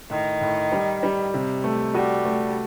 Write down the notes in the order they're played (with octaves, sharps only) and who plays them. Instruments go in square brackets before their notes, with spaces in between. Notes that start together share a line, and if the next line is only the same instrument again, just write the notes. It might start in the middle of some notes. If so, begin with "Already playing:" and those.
[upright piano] A2 [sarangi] D#3
[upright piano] A2
G3
G3
C3
A3
[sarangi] G3 [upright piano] F#4
[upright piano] A3